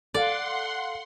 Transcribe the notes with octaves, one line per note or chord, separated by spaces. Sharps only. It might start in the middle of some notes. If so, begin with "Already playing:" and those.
A4 D5 F5 F#5 C6